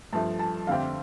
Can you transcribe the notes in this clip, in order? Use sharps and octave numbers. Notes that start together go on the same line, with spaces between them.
G2 F3 A3 A5
A5
F2 D3 A3 C4 G4 F5